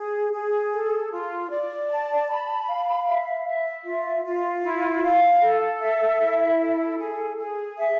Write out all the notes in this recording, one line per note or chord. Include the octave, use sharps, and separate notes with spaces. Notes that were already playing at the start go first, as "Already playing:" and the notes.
Already playing: G#4
G#4
A4
F4
D5
A5
B5
F5
E5
E5
F4
F4
E4
F5
A4
E5
E4
A4
G#4
G#4
E5